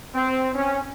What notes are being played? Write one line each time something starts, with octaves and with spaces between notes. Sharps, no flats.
C4
C#4